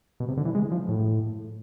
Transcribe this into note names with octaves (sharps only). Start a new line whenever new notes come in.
B2
C3
D3
E3
G#3
F3
A2